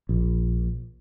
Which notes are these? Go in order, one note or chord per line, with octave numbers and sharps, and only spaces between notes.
A#1